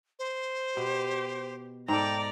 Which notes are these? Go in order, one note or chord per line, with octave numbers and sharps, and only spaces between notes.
C5
B2 G4
G#2 A4 D5 G5 A#5